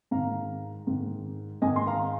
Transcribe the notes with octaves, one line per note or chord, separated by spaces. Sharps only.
G#2 D#3 F5 A#5
G#2 D#3
G#2 D#3 D#5 G#5
C6
F5 A#5